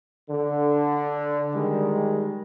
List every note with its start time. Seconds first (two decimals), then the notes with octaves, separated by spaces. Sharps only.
0.29 D3
1.54 D#3 G3 G#3